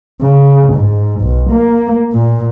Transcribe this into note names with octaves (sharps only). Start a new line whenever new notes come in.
C#3
G#2
B1
A#3
A#2